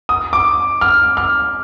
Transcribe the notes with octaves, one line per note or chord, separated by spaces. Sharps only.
D#6
D6
F6
F6